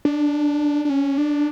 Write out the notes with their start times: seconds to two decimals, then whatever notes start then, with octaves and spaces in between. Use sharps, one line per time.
0.05 D4
0.85 D4
0.90 C#4
1.18 D4